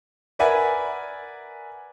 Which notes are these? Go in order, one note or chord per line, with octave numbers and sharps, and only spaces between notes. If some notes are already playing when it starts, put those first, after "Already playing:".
A#4 B4 D5 E5 F#5 G#5